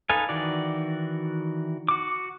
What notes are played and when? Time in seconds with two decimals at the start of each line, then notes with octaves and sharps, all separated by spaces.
0.09 D#4 A4 B4 F5 G#5
0.29 D#3 E3 F#4 D5
1.88 F#4 D6